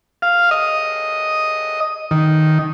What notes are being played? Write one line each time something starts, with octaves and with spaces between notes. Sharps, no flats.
F5
D#5
D#3